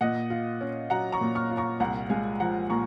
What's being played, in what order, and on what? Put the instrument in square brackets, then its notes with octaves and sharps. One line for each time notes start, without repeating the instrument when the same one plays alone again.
[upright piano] A#2 D#5 F#5
F4
C#4
F#3 F#5 A#5
A#5 C#6
A#2
C#6 F6
F4
A#5 C#6
C2 F#5 A#5
G#3 F5 G#5
F3 F#5 A#5
A#2 A#5 C#6